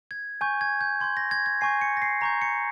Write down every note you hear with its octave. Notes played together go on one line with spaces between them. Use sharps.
G#6
G#5 C#6 G6
G#6
G6
C6 G6 G#6
A#6
G#6
G#6
G#5 C#6 G6 C7
C#7
A#6
C7
A#5 C#6 G6 A#6
C#7